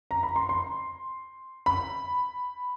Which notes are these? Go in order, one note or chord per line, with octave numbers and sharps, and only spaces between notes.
A#5
B5
C6
C6
B5